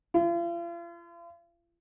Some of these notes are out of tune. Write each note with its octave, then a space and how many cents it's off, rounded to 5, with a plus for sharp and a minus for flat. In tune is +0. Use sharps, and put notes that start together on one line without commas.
F4 -40